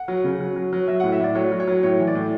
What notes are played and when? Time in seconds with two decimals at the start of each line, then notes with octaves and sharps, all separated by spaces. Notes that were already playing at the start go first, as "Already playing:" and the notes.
Already playing: F#5
0.08 F#3
0.24 C#3
0.40 F#3
0.56 F#3
0.73 F#3
0.88 F#3 E5
1.00 F#5
1.03 A2
1.12 E5
1.20 A2 D5
1.35 F#3 C#5
1.52 F#3
1.60 C#5
1.67 F#3
1.83 A2 C#5
1.99 E3
2.07 D5
2.15 A2